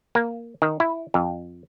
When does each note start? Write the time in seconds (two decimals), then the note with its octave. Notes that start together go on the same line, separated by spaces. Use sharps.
0.15 A#3
0.62 D#3
0.80 E4
1.14 F2